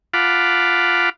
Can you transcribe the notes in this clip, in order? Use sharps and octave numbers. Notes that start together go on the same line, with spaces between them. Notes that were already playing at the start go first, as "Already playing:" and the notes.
F4 F5 F#5 A5 B5 D6